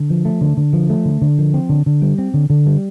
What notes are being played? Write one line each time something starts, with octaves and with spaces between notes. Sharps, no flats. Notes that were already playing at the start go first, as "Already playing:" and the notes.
Already playing: D3
F3
A3
D3
D3
F3
A3
D3
D3
F3
C4
D3
D3
G3
C4
D3
D3
G3